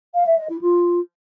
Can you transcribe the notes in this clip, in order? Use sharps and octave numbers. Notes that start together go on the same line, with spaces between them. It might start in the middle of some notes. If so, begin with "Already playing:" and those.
F5
E5
D#5
E4
F4